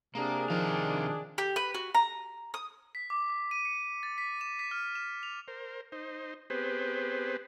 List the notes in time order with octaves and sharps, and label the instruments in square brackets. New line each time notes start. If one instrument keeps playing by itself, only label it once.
[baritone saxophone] C3 [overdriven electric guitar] A#3 [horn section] D4 G#4
[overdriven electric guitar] C3 F5 [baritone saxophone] D#3 [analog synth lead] F3
[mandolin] G4
B4
F#4
A#5
D#6
[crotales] B6
D6
D6
D#7
C#7
A6
B6
E7
B6
F6
E7
F7
[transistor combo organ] A#4 C5
D#4 C5
B3 C4 G4 G#4 B4 C5